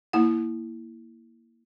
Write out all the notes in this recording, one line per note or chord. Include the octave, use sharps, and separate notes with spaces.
A#3 E4 F#5